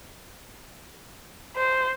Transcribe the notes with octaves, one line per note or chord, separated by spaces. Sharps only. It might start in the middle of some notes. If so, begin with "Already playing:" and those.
C5